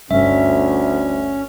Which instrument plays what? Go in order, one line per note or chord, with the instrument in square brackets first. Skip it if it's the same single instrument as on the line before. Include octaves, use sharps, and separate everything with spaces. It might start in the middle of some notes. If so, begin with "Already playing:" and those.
[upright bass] G1 [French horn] D2 [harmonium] C#4 [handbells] E5